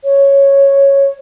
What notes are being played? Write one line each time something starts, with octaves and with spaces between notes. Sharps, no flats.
C#5